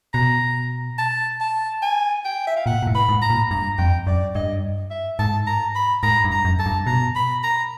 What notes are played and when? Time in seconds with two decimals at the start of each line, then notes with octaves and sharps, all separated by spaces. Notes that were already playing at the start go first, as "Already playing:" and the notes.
0.13 B2 A#5
0.98 A5
1.40 A5
1.82 G#5
2.24 G5
2.47 E5
2.56 F5
2.66 A#2 F#5
2.82 A#2
2.87 A2
2.95 B5
3.09 G#2
3.22 A#5
3.30 A#2
3.51 G2 A#5
3.78 F2 G5
4.07 F#2 D5
4.35 G2 D#5
4.90 E5
5.19 G#2 A5
5.46 A#5
5.75 B5
6.03 G#2 A#5
6.25 G2
6.31 A#5
6.45 F#2
6.59 A5
6.66 G2
6.86 B2 A#5
7.15 B5
7.43 A#5